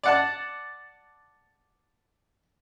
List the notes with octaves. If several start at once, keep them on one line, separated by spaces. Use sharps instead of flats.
D5 F#5 A5